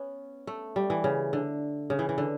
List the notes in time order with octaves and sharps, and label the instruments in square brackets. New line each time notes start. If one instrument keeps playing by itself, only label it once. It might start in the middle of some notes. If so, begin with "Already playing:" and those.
Already playing: [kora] B3 C#4
A3
G3
E3
C#3
D3
C#3
E3
E3
D3